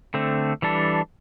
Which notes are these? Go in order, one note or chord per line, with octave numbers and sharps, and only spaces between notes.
D3 A3 C4
E3 G3 D4 A4